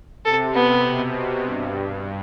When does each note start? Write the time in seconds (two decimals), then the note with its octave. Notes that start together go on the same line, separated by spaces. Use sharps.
0.25 C3 A4
0.54 B3
0.84 B2
1.43 G2